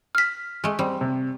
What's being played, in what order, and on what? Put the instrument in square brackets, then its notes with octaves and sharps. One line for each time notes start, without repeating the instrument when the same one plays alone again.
[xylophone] F6 B6
[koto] G#3 A3
[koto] G3 [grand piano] C4
[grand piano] C3